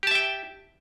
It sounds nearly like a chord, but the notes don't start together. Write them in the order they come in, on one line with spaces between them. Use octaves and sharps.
G4 A5 E5 G5